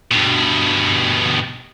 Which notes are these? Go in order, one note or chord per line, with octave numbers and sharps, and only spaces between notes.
G2 B2